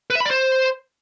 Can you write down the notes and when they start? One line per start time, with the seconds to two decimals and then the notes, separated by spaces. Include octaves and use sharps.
0.10 B4
0.15 E5
0.20 B5
0.25 D5
0.31 C5